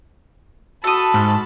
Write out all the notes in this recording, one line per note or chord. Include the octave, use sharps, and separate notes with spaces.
F#4 A4 A5 B5 D#6
G#2